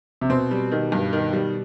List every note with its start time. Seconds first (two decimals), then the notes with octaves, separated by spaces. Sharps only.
0.21 C3
0.30 B2 C4
0.51 G3
0.72 D#3
0.92 G2
1.13 D#3
1.33 G3